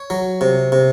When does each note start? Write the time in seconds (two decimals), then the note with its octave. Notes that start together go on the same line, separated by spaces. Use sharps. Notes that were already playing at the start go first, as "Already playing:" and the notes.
Already playing: C#5
0.10 F#3
0.41 C3
0.72 C3